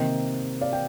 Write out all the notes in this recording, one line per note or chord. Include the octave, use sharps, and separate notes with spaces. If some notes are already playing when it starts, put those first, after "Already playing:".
Already playing: C3 D#3 A#3 D#5 G5
D5 F5
G5